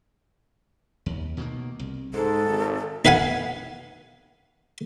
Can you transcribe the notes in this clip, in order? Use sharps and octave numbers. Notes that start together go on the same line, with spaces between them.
D#2
B2 D#3 A#3
C2
G#2 G#3 A4
G#1
D#4 B4 F5 F#5 G#5